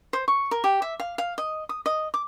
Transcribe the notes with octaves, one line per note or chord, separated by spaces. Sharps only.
C5
C#6
A#4
G4
E5
F5
F5
D#5
D#6
D#5
D6